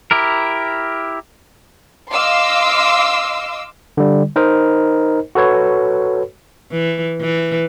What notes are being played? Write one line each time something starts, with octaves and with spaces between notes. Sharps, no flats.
E4 G4 A#4
D#5 F5 C6 D6 E6
D3 G3
D#4 A#4 C5 D#5
F#4 A4 B4 C#5
E3
E3